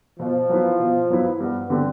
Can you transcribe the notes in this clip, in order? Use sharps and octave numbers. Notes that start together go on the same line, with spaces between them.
B2 F3
F#3 B3 E4
B2
F#3 B3 E4
G2 B3
D3 G3 C4